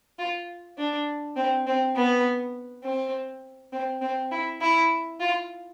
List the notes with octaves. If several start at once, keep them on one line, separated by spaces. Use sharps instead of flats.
F4
D4
C4
C4
B3
C4
C4
C4
E4
E4
F4